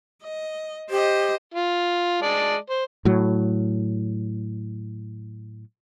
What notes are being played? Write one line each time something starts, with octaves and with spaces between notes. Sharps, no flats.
D#5
G4 C5 D#5
F4
G#3 D5 A5
C5
A2 F#3